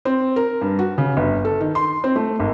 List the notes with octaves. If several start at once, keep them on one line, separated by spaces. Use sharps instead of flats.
C4
A#4
G2
F#4
C#3
G1
A4
D#3
C6
C4
A3
G#1